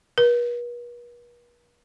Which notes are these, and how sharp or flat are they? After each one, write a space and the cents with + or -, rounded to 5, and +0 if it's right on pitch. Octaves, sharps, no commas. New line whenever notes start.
B4 -45